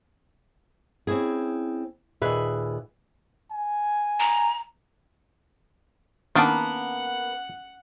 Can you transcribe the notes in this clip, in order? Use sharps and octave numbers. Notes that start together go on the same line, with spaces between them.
C4 C#4 E4 G#4
D#2 A#2 G#4 B4 E5
G#5
A#5
D#3 A#3 B3 C#4 D4 F#5 A5